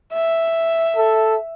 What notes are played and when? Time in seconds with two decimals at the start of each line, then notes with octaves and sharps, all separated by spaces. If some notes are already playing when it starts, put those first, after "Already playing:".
0.13 E5
0.96 A4